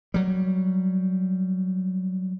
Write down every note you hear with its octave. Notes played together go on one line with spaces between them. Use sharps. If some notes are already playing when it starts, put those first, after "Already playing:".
F#3 G3